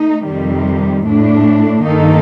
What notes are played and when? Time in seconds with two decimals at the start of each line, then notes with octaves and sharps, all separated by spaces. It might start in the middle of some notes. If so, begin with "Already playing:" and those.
Already playing: A3 D#4
0.25 F2 C3 D#3 G3
1.04 A2 A3 D4
1.85 G2 D#3 A#3 D#4 A4